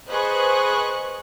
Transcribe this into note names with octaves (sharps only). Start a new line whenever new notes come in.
G#4 B4 C5 D#5 C#6 F#6